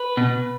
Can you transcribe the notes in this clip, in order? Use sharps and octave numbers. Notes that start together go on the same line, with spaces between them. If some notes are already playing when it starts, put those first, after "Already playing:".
Already playing: B4
B2